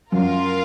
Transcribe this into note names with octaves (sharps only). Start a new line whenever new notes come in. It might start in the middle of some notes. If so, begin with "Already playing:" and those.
F#2 F4 A#4 F5